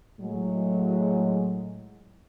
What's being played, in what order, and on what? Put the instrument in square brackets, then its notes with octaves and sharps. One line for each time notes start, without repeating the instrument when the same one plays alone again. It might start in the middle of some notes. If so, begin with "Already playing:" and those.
[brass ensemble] A2 F#3 G#3